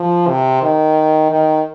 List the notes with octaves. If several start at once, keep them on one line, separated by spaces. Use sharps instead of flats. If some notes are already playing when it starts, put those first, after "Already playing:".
Already playing: F3
C3
D#3
D#3